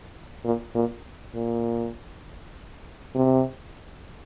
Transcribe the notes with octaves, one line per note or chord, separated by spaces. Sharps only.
A#2
A#2
A#2
C3